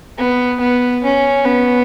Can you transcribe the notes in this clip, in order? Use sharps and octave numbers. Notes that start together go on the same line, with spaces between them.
B3
B3
C#4
B3